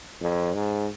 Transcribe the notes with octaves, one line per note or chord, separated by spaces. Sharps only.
F2
G#2